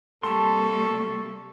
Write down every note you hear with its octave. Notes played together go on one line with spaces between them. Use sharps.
C3 G3 A#3 A4 A5 C6 C#6